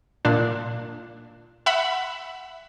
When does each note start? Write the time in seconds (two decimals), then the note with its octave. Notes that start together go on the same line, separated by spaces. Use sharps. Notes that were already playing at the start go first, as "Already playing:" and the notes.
0.25 A#2 D4
1.66 E5 F#5 B5